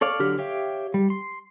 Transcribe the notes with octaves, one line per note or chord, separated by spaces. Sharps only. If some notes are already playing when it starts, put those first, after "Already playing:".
A4 C#5 D5 F5
D3 F#3 G4 F6
G4 C#5 E5 F5 G5
G3
C6